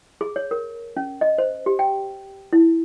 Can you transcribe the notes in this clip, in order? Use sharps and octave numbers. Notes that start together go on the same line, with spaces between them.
G#4
C#5
A#4
C#4
D#5
C5
G4
G5
E4